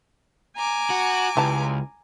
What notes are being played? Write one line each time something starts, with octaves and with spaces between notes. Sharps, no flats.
G#5 A#5 D6
F#4
C#2 E3 G3 A5